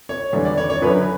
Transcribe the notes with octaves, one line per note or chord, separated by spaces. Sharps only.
C#5
E2 D3 G3
D5
C#5
C#5
F#2 D3 F#3 B4